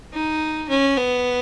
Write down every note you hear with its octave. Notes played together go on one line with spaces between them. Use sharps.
D#4
C#4
B3